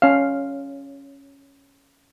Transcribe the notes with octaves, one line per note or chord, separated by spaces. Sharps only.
C#4 F5